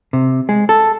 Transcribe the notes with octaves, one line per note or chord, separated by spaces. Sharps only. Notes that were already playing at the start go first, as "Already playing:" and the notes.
C3
G#3
A4